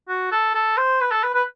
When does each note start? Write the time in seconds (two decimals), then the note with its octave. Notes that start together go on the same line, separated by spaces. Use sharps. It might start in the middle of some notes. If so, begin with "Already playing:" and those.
0.09 F#4
0.32 A4
0.54 A4
0.77 C5
1.01 B4
1.11 A4
1.23 B4
1.34 B4